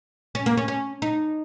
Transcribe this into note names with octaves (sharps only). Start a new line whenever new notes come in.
C#4
A#3
C#4
C#4
D#4